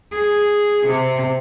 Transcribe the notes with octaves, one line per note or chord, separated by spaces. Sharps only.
G#4
C3